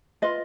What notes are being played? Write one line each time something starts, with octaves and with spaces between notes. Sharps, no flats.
F4 B4 D#5